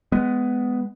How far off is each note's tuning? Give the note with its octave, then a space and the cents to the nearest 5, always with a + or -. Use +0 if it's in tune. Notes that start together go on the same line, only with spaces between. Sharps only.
G#3 +0 B3 +15